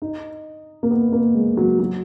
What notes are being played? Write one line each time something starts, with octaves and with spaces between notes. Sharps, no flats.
D#4
A#3
B3
A#3
G#3
F#3
F#3